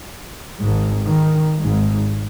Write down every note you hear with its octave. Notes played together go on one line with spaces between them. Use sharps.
G#1 G#2
D#3
G#1 G#2